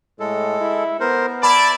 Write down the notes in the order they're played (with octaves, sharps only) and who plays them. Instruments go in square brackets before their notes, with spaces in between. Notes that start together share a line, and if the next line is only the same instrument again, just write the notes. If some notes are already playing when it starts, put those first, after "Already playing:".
[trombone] A2 [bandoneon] G#3 A4
[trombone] E4
[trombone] B3 [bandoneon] A#4 C5
[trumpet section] E4 D5 [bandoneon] A5 [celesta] B5